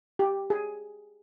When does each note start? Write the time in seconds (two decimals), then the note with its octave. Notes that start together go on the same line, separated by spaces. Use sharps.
0.19 G4
0.50 G#4